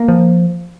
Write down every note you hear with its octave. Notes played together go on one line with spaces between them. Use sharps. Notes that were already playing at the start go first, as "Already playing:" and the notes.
Already playing: A#3
F3